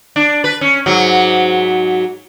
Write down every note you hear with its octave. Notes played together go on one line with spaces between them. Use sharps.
D4
B4
C#4
G#2 F#3